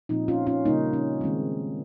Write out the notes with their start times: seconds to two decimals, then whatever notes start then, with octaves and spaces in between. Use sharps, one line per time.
0.09 A#2 F3 C4 D#4
0.28 C#4 F4
0.47 C#4 F4
0.65 C#3 G3 A#3 D#4
0.93 C#4
1.21 D#3 G#3 C4